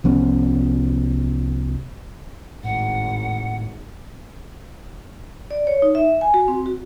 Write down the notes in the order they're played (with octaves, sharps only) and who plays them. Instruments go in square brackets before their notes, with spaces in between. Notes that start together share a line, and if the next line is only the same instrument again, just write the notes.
[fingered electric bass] C2 F3 B3 C#4
[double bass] G#1 [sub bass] A2 [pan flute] F#5
[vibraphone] D5
C#5
D#4
E5
G#5
F#4
C4
F#4